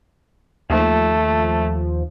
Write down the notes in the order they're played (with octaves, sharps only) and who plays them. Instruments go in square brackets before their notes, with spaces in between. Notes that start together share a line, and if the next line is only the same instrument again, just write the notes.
[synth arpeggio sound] D#2 F3 [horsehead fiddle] A3